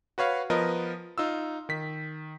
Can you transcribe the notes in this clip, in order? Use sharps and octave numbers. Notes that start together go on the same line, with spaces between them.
F#4 B4 C#5 F5
F3 B3 A#4 B4 D#5
D#4 F4 E6
D#3 B6